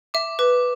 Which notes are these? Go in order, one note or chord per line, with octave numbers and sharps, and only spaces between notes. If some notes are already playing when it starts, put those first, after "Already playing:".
E5 D6
B4 D6